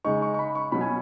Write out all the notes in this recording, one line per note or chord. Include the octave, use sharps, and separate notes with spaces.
C#3 G#3 D#4 C#6
C#6
C#6
B5
C#6
B2 F#3 C#4 B5
G#5